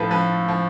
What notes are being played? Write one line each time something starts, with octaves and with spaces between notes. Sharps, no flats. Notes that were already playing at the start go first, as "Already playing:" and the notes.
Already playing: A2 F3 A4 B4
F3 B4
F3